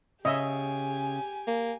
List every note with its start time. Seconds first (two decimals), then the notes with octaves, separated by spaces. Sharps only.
0.25 C#3 G4 D#5 E5 G#5
1.47 A#3